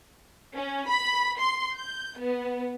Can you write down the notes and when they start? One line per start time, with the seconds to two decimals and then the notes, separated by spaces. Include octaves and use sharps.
0.54 C#4
0.87 B5
1.39 C6
1.76 G6
2.19 B3